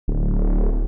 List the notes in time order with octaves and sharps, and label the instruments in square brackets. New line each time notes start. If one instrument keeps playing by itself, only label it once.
[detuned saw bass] D1